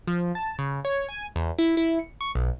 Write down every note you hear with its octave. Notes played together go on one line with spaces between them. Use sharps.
F3
A5
C#3
C#5
G#5
E2
E4
E4
C#7
C#6
B1